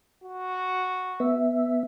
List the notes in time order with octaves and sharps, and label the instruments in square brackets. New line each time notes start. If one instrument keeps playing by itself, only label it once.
[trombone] F#4
[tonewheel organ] B3 E5